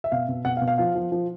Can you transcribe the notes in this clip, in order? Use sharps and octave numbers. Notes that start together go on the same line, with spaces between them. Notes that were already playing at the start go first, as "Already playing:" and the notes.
E5
B2 F5
B2
B2 F#5
F5
B2
F5
F3 F5
F3
F3